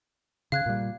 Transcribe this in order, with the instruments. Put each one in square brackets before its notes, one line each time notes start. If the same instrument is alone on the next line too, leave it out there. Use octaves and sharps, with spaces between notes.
[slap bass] C#3 [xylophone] F5 F#6 G#6
[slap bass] A#2 G3